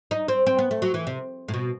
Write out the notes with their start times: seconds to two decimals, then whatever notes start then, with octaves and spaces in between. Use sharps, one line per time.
0.11 D#4
0.28 C4
0.47 C4
0.59 B3
0.71 A3
0.82 F#3
0.94 E3
1.07 C3
1.48 A2
1.54 B2